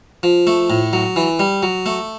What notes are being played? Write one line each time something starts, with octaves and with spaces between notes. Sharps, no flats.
F3
A3
A2
F#3
E3
G3
F#3
A3